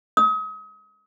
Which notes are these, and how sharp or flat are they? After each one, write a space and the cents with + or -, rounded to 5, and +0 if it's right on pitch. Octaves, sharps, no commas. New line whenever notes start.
D#6 +35